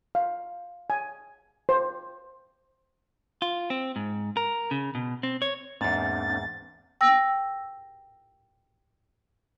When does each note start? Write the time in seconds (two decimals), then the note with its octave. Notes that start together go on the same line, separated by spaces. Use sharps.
0.15 F5
0.90 G#5
1.69 C5
3.42 F4
3.70 C4
3.96 G#2
4.37 A#4
4.71 C#3
4.95 B2
5.23 C4
5.42 C#5
5.81 E2 G#2 A#3 C4 D4 A6
7.01 G5 E6 A#6